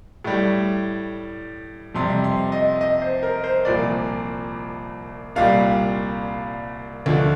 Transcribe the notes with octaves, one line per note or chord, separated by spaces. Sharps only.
A2 G3
F2 C3 G3 C6
C6
D#5
D#5
C5
A#4
C5
C2 A#2 F3 D5
C2 A#2 G3 F5
D2 D3 F3